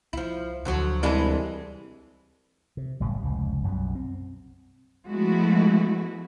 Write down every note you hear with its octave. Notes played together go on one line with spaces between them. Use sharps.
C2 F3 E4
D2 D3 F3 F#3
C2 E3 G#3 D4
C3
F#1 A2 G3
F1 C#2
B1 F#2 B2 G3
C4
F3 G#3 A3 B3 E4 F#4